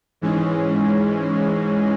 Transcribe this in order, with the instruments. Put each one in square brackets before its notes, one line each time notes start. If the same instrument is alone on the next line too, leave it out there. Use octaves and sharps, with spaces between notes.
[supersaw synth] G#2 E3 G#3 C#4